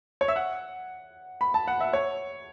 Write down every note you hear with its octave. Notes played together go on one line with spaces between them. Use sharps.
C#5
E5
F#5
B5
A5
F#5
E5
C#5